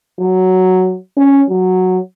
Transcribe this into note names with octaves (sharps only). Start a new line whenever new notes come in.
F#3
C#4
F#3